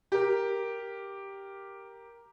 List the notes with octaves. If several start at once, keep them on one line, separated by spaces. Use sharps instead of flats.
G4 A#4